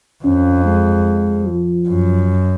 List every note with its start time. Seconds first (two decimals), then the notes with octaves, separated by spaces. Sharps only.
0.24 F2 C#4
0.65 G#3
1.47 F3
1.88 F#2